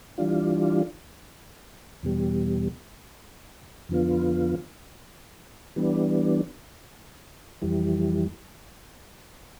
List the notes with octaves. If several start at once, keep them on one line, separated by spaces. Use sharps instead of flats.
E3 G3 D4 F4
E2 B2 G3
F2 D3 F3 B3 F4
E3 G3 B3 D4
F2 E3 G3